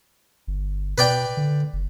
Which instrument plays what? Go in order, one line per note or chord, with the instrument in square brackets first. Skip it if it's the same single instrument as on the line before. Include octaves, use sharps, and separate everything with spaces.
[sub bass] G1
[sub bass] B2 [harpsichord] B4 D5 G5
[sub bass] D3
F#1